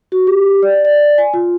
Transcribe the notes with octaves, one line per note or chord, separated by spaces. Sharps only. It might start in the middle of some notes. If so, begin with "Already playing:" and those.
F#4
G4
D5
D5
G#5
F4